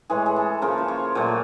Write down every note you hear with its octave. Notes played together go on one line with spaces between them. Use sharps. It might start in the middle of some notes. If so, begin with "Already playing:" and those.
A2 E3 G#3 G#4
G#4
A4
C#3 F3 A#3 A#4
C5
C#5
A#2 F#3 A3